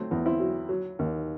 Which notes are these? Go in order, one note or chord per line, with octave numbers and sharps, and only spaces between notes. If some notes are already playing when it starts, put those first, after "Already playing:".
Already playing: F#3 A3 C4
E2
C4 E4
F#3
F#3
D#2